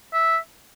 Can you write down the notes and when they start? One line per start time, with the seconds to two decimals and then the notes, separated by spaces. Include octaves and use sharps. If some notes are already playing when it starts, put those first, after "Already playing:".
0.13 E5